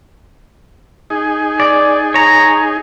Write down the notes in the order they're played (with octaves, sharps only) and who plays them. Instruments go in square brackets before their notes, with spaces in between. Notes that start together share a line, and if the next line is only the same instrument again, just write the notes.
[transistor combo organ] D#4 G#4
[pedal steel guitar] D5
C#5 A#5